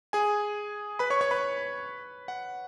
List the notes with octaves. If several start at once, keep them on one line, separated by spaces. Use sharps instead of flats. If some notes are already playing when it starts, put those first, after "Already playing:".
G#4 G#5
B4 B5
C#5 C#6
C#5 C#6
B4 B5
F#5